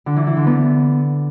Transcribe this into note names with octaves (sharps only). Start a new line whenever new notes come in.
D3
E3
E3
D3
B3